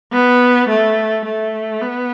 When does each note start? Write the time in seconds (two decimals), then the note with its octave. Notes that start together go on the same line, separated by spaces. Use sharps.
0.12 B3
0.69 A3
1.25 A3
1.81 B3